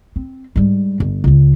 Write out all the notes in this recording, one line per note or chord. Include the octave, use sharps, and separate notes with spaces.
C4
G#2 G3
G1
C#2 C#4